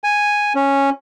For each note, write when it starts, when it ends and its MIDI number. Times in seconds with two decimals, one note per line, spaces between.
0.04 0.53 80
0.55 0.90 61